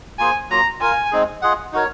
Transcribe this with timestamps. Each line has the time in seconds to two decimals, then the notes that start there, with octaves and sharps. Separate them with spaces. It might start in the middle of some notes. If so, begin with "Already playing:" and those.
0.19 A#3 F4 G#4 C5 G#5
0.50 F#3 A#3 F4 A#5
0.80 F4 A#4 F5 G#5
1.12 G#3 C4 D#4 G#4
1.42 F4 G#4 D#5 F#5
1.73 D#4 F#4 A#4 C#5